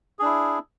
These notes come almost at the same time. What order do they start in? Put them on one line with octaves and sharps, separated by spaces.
G#4 D4 E4